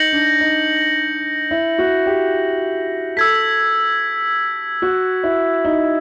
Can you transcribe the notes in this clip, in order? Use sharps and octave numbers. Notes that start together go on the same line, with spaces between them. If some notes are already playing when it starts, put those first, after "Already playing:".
Already playing: D#4 G6 A#6 C#7 F#7
D4
D#4
E4
F#4
G4
A4 E6 G#6 B6
F#4
E4
D#4